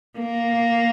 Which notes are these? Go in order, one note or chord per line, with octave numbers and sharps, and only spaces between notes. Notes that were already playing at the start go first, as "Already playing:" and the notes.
A#3